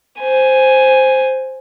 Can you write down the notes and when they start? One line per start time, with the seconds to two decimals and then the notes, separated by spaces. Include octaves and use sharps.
0.20 C5 G#5